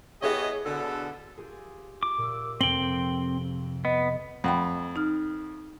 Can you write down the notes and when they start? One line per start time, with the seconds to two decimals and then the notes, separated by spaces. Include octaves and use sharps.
0.22 B3 E4 G4 G#4 C#5 D#5
0.66 B2 D3 G#4 A4
1.38 F4 G4 G#4
2.03 F4 D6
2.18 A#2 E5 E6
2.61 F2 C3 C4 G5 F#7 G7
3.85 B3 D#5
4.44 F2 F#5 G5 B5
4.96 D#4 F6